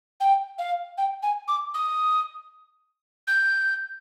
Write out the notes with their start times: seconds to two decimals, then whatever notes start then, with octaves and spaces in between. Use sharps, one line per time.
0.20 G5
0.58 F5
0.98 G5
1.23 G#5
1.48 D6
1.74 D#6
3.27 G6